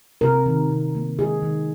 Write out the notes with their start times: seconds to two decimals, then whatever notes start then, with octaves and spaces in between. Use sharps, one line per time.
0.21 C3 A#4
0.46 D#3
0.70 C3
0.95 A#3
1.19 D#3 G#4
1.43 D#3